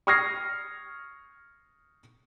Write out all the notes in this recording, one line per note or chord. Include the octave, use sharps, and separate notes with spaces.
C#6 D#6 F6 G#6 A#6 C7